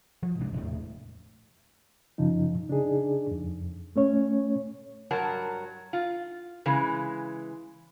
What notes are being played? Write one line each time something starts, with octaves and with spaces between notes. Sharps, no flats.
F3
C2 G#2 C3 D4
E1 A2
F#2 C#3 F3 D#4
C#3 D4 D#4 G#4
F2
A3 C#4 C#5
G2 F#3 A#4 A5
F4
C#3 E3 G#3